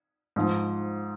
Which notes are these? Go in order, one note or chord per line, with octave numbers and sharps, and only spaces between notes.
G#2 F3